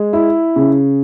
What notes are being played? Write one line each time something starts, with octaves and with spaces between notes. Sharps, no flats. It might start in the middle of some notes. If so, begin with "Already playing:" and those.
Already playing: G#3
E4
C#3